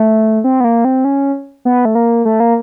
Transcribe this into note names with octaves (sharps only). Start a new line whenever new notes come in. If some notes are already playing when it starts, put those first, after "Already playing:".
Already playing: A3
C4
B3
A#3
C4
C#4
B3
A3
A#3
A3
A#3